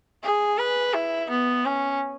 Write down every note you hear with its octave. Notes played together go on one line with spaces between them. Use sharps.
G#4
B4
E4
B3
C#4